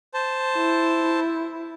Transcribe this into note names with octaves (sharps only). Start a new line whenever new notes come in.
C5 A5
E4